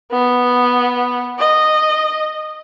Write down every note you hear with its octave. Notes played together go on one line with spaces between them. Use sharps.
B3
D#5